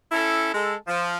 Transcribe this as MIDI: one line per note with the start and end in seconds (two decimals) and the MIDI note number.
0.11 0.51 61
0.11 0.51 64
0.11 0.51 69
0.53 0.74 56
0.53 0.74 69
0.87 1.18 53